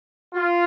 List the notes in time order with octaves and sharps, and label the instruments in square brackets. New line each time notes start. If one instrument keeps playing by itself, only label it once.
[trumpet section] F4